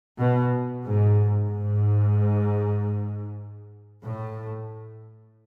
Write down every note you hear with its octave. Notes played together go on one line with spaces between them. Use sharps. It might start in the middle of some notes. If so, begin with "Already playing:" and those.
B2
G#2
G#2
A2